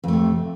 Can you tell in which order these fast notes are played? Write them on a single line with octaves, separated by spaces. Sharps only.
F2 A3 C3